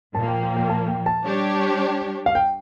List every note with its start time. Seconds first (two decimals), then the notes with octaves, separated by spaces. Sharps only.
0.15 A#2 F3 A#3 A5
0.28 G5
0.43 G5
0.57 G5
0.69 A5
0.88 G5
1.06 A5
1.25 G3 D4 G4 C#5
2.26 F5
2.35 G5